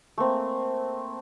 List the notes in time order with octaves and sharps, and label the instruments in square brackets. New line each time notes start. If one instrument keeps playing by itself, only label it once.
[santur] A3 A#3 C4